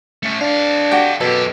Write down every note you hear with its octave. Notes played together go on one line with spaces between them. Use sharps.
A3 C#4
D4 A4 F5
F#4 G4 G5
F#2 B2 G4 A4